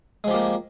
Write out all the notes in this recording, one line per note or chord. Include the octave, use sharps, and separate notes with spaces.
F3 G#3 A#3 G4